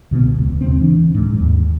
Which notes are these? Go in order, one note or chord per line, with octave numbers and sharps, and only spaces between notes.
C2 B2 D3 B3
D#1 C#2
D#2 C#3 C4
E3 D4
D1 G#2
D#2